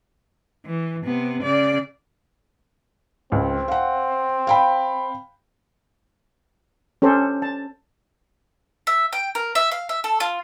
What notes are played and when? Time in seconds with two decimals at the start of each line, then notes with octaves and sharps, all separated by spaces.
0.66 E3
1.04 C3 B3
1.43 C#3 D5
3.32 C#2 C4
3.68 F5 F#5
4.47 F5 G5 B5
7.02 C#4 G4 A4 C5
7.42 A5
8.87 E5
9.13 G5
9.35 A#4
9.55 E5
9.71 F5
9.89 E5
10.04 A4
10.20 F4